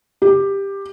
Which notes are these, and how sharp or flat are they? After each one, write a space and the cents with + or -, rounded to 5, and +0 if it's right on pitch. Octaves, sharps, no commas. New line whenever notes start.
G4 +10